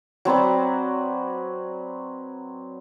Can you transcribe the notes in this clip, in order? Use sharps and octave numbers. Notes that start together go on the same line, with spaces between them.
F#3 C4 B4 D5